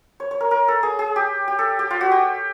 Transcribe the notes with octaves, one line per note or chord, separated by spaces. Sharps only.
C#5
C#5
A#4
A#4
A4
G#4
G#4
G4
G4
A4
G4
F4
F#4
G4